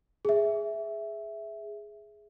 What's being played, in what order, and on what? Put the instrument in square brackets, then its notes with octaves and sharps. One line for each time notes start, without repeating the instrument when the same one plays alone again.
[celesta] G#4 E5